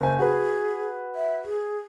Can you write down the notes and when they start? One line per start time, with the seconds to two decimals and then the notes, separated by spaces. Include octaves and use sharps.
0.01 F#1 C5 G#5
0.19 F#4 G#4 B4
1.15 E5
1.44 G#4